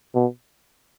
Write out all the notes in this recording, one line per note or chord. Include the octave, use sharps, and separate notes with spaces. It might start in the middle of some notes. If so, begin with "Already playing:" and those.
B2